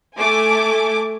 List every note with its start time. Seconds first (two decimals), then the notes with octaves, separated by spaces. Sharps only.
0.18 A3 G#5 D6